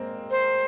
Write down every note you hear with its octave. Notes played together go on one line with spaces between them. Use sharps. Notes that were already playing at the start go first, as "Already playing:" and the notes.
Already playing: G#3 A#3 C4
C5